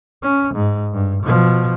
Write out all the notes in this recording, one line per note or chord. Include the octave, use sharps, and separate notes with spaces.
C#4
G#2
G2
B2 F3